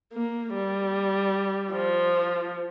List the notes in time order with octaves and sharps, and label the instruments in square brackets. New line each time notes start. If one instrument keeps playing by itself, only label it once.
[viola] A#3
G3
F3